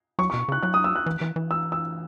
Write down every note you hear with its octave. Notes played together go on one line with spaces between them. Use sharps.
F#3 C#6
C#6
B2
C#3 F#6
F#3 F#6
D#6
E6
F#6
E3
E3
E3
E6
E6